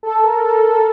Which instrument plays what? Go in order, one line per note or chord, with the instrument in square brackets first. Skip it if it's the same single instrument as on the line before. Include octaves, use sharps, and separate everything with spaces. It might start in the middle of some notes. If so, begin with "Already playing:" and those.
[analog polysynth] A4
A#4
A4
A4